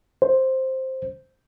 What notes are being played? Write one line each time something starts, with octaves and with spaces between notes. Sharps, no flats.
C5